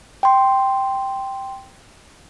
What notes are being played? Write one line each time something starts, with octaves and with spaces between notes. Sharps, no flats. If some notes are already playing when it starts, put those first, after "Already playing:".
G5 C6